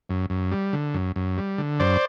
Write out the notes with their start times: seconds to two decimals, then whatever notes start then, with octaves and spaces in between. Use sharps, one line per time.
0.09 F#2
0.30 F#2
0.51 G3
0.73 D3
0.94 F#2
1.16 F#2
1.38 G3
1.58 D3
1.80 F#2 C5 D5